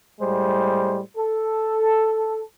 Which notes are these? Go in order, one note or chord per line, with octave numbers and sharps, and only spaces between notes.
A2 G3 G#3 C5
A4